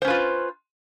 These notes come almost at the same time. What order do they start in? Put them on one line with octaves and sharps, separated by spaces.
C5 C#4 B4 F4